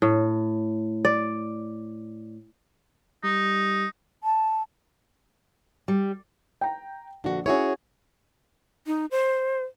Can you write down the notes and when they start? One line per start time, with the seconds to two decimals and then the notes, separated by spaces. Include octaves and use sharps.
0.02 A2
1.05 D5
3.24 G3 D#4
4.24 A5
5.88 G3
6.61 G5 A#5
7.24 A#1 D3 F#4
7.46 C#4 E4 F#4 G#4 C#5
8.87 D#4
9.11 C5